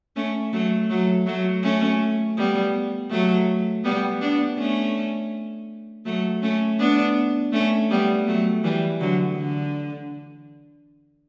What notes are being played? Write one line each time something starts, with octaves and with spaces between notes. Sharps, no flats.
A3 C#4
F#3 A3
F#3 A3
F#3 A3
A3 C#4
G3 B3
F#3 A3
G3 B3
B3 D4
A3 C#4
F#3 A3
A3 C#4
B3 D4
A3 C#4
G3 B3
F#3 A3
E3 G3
D3 F#3
D3